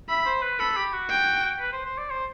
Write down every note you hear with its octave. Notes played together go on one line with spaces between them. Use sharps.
E5 B5
C5
B4
A4 B5
G4
F#4
G5
B4
C5
C5
D5
C5